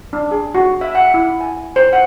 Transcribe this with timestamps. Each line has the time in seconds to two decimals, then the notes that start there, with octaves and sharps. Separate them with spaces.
0.13 D4
0.31 G#4
0.55 F#4
0.81 E5
0.95 F#5
1.14 E4
1.41 G#5
1.76 C5
1.93 F#5